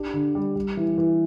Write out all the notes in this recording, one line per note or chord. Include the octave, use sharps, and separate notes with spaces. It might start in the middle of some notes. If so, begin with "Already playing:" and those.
Already playing: D4 G4
D3
G3
G3
E3
E3